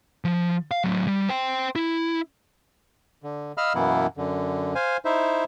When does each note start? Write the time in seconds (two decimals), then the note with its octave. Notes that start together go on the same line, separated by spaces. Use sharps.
0.25 F3
0.71 F5
0.84 A2 F#3
1.07 G3
1.29 C5 G5
1.76 E4
3.23 D3
3.57 D#5 F5 B5 E6 F6
3.75 F#2 B2 E3 A#3 B3 E4
4.17 F#2 D3
4.75 C5 F5 G#5
5.05 D#4 E4 C5 E5